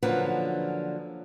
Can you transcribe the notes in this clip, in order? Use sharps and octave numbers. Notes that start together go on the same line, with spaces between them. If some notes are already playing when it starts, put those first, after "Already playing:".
D3 F3 F#3 A#3 C#4 B4